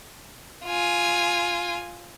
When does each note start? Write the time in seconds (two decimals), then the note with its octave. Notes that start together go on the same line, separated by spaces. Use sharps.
0.66 F4 G#5